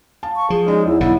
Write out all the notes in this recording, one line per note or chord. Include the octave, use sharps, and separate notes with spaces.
F5 A5
C#6
F3 G#4
G#3 C#4 D#4 D5
E2 E4
B1 G#2 D3 B3 E4